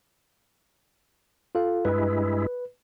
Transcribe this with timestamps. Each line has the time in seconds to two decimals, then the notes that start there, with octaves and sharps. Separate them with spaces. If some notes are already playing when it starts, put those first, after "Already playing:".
1.55 F4 A4 F5
1.85 G2 G#3 E4 B4